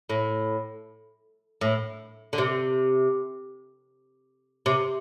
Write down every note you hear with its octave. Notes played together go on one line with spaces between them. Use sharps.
A2
A2
D3
C3
C3